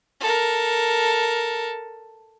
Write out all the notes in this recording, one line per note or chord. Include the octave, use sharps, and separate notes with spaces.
A4 A#4